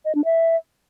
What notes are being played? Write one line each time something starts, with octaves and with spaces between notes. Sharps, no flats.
D#5
D4
E5